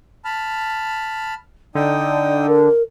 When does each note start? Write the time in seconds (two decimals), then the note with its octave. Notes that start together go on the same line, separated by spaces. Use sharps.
0.25 A5 B5 F6
1.75 D3 D#4 D5 G5 D#6
2.47 A#4